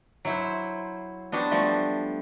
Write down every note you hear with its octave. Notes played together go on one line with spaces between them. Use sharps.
F#3 E4 C5
B3 D4 F#4 G4 C5
F3 G3 A3